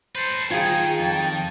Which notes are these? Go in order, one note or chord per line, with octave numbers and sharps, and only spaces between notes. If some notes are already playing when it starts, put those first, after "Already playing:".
A4 B4 C5
D#3 F4 G#4 G5 G#5
F2 A5